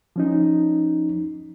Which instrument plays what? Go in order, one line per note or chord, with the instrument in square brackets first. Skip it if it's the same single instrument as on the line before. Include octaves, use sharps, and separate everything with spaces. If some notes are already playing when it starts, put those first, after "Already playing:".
[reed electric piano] F3 C#4 D#4